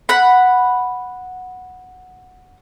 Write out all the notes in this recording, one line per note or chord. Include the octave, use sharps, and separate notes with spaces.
F#5 B5